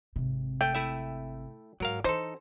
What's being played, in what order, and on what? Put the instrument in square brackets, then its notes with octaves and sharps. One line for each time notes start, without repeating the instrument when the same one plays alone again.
[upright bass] G#1 C3
[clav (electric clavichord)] A3 [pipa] G5
[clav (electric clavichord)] A3 E4 E5
[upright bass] G#2 [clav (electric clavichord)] F#3 A#4 F5
[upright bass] E3 [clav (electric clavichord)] D#4 A4 [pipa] C5